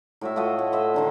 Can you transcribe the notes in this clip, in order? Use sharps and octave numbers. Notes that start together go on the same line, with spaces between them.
A2 F#4 E5
A3 F4 F#4 D#5
A2
C5 D#5 E5
D3 D#3 D4